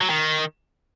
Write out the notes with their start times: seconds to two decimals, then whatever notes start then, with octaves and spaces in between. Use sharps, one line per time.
0.01 F#3
0.10 D#3